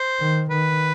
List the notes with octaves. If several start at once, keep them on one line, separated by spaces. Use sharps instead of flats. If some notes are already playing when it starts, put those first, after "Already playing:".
Already playing: C5
D#3
D#3 B4